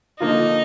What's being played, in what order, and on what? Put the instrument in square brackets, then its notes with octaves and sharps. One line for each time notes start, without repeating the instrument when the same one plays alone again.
[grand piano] D3 F3 A#3 F4 [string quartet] D#4